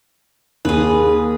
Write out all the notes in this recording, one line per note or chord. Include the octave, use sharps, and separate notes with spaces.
D#2 G#4 B4